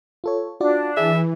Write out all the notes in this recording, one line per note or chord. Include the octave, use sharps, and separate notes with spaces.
F4 A4 C#5
D4 F4 F#4 D5
E3 G#4 E5